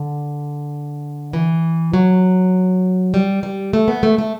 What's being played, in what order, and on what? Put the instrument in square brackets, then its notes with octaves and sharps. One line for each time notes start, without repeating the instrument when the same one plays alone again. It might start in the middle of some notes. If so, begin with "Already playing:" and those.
Already playing: [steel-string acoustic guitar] D3
E3
F#3
G3
G3
A3
B3
A3
A3